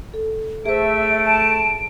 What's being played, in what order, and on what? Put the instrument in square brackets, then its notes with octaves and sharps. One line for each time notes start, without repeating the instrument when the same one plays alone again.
[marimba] A4
[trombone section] A3 [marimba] G#4 C5 [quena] E5 [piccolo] D7
[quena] A5